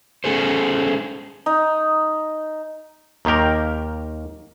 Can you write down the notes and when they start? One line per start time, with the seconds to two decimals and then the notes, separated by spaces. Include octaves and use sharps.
0.24 A3 C#4 G#4 A4 C5
1.46 D#4
3.25 D#2 D#3 A#3 G4 A#4